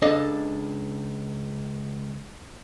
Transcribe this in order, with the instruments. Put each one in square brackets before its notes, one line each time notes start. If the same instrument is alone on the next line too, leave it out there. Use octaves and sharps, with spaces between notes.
[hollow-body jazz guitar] C#2 D4 A4 D#5 F5